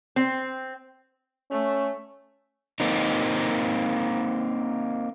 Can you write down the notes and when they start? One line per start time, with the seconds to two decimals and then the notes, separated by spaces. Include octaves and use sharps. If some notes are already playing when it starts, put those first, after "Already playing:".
0.16 C4
1.51 A3 C#4
2.80 A#3 C4 D#4